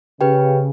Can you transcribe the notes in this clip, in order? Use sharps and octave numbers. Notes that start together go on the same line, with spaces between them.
C#3 G4 B4 G5